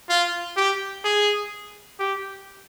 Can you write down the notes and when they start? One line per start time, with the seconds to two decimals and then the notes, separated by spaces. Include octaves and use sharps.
0.10 F4
0.57 G4
1.04 G#4
2.00 G4